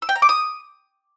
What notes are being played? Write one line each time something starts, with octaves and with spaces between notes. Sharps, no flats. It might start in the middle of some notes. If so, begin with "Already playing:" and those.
E6
G5
A#5
D6
D#6